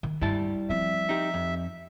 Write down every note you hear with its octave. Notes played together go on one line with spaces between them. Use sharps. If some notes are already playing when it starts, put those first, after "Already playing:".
D#3
G2 G3 G#3 E4 A5
F3 C4 E5
D#4 G4
F2